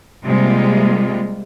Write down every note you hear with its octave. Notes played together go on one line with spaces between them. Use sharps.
C3 G3 G#3 A#3 F4